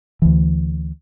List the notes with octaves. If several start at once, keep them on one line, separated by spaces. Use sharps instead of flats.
D2 E3